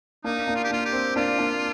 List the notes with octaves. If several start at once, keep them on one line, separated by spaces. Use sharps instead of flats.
A#3 D4 D#4
A#3 D4
F4
G4
A#3 D4 F4
G4
C4
A#3 D4 F4
A#3 D4